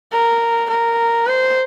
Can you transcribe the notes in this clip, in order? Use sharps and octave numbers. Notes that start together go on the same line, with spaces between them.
A#4
A#4
C5